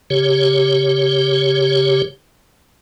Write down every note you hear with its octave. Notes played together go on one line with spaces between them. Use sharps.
C#3 G4 C#5